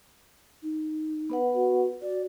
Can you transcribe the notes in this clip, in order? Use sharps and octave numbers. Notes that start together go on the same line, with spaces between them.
D#4
B3 B4 F#5
F#4
F#4 D5